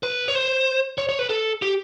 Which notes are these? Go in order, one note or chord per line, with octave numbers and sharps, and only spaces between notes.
B4
C#5
C5
C#5
C#5
B4
A4
G4